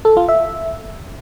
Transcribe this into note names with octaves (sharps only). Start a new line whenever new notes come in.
A4
F4
E5